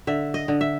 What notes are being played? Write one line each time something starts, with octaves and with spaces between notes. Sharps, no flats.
D3 E5
D#5
D3
E5